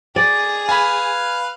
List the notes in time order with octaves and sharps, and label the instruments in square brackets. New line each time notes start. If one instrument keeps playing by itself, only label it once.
[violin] G#4 [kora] D5
[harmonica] B4 F5 [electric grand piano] G#5 B5